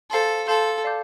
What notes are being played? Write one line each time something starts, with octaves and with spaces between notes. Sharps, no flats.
A4 C5 F5 C6
A4 F5 A5 C6 G6
D5 F5 A5 D6 G6